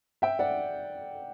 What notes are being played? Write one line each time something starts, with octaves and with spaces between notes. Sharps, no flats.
E5 G5
D5 F#5